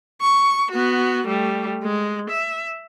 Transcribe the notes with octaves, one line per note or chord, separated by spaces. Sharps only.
C#6
B3 F#4
G3 A3
G#3
E5